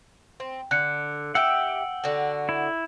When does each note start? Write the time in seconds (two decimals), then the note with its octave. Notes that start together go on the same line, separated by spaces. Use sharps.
0.40 C4
0.71 D3 F#6 C#7
1.35 G4 E5 F#5 G5 E6
2.04 D3 F#4
2.49 E4